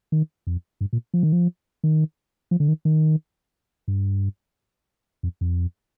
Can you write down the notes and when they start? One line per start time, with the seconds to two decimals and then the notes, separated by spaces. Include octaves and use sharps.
0.12 D#3
0.47 F2
0.81 G2
0.93 A#2
1.14 F3
1.23 D#3
1.32 F3
1.84 D#3
2.51 F3
2.60 D3
2.68 D#3
2.85 D#3
3.88 G2
5.23 F2
5.41 F2